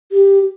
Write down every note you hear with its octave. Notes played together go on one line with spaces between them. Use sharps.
G4